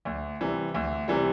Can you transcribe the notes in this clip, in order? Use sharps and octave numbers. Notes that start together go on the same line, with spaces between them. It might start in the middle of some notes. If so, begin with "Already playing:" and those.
D2
C3 E3 G3
D2
C3 E3 G3